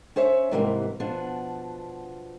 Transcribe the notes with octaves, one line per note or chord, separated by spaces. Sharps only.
C#4 C5 C#5 E5
G#2 C3 E3 G3 A3 A#3
B2 F3 B3 D4